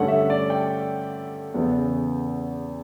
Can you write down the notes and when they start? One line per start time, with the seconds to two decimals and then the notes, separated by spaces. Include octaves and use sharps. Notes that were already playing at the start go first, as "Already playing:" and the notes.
Already playing: G2 D3 A3 C#4 F#5
0.08 E5
0.30 D5
0.50 G5
1.54 E2 C#3 E3 B3